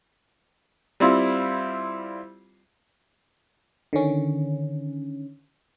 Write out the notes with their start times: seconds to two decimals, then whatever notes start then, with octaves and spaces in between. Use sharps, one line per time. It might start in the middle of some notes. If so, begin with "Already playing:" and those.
1.00 G3 C4 E4 F4
3.93 D3 D#3 C#4